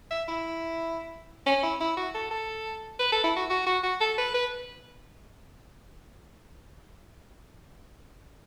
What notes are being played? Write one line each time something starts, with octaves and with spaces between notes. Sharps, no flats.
E5
E4
C#4
E4
E4
F#4
A4
A4
B4
A4
E4
F#4
F#4
F#4
F#4
A4
B4
B4